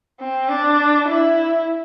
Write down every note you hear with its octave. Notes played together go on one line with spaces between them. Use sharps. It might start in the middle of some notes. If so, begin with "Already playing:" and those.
C4
D4
E4